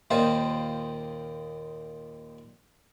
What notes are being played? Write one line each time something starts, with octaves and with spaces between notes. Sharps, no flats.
D#2 A#2 C4 D#4 F4 C5